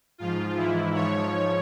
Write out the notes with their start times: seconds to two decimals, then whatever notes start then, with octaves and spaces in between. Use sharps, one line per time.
0.18 G#2 F3 F4
0.57 G#2 E3 E4
0.94 G#2 F3 C#5